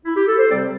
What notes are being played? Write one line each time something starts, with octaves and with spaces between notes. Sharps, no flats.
E4
G4
A4
C5
C3 G3 C4 A4 D5